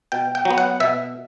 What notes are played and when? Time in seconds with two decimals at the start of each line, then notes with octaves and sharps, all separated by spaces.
0.12 B2 G5
0.35 G5
0.45 F#3
0.50 B3
0.58 F#5
0.80 B2 E5